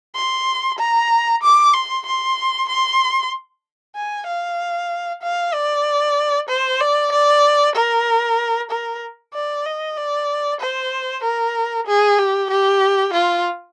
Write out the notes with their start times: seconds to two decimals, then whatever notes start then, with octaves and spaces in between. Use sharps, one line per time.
0.15 C6
0.78 A#5
1.43 D6
1.74 C6
2.06 C6
2.69 C6
3.96 G#5
4.27 F5
5.22 F5
5.54 D5
6.49 C5
6.80 D5
7.12 D5
7.75 A#4
8.70 A#4
9.34 D5
9.65 D#5
9.96 D5
10.60 C5
11.23 A#4
11.87 G#4
12.18 G4
12.50 G4
13.13 F4